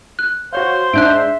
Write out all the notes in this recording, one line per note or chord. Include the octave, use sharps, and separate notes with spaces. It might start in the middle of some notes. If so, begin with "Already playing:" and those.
F#6
F#4 C5 C#5 F5 C6
G#2 D4 E5 F#6 G6 D7